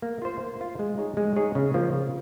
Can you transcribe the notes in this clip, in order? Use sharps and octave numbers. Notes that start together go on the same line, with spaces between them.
A#3
F4 C5
A#3
F4 C5
G#3
D#4 G#4 C#5
G#3
D#4 G#4 C#5
C#3
F3 A#3 F4
C#3